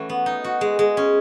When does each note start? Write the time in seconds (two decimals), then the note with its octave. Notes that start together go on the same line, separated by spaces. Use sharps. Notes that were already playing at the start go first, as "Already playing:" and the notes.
Already playing: E3 A3 C#4 F#4
0.09 B3
0.26 D#4
0.44 F#4
0.61 G#3
0.79 G#3
0.97 C#4